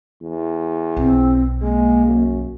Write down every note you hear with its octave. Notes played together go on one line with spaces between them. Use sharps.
E2
B1 C4
G#3 A#3
F#2